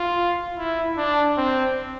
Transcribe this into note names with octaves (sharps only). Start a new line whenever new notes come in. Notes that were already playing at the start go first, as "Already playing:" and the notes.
Already playing: F4
E4
D4
C4